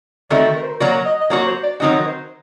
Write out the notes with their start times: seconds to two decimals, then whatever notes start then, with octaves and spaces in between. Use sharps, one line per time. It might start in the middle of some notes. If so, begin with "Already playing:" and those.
0.30 D#3 A3 C4 F#4 D5
0.56 A#4
0.63 C5
0.70 A#4
0.80 F#3 A#3 F#4 D5
1.06 D#5
1.21 D#5
1.30 F#3 A#3 F#4 D5
1.47 C5
1.63 D5
1.80 D#3 F#3 C4 D#4 F#4 D#5
1.99 A#4
2.06 C5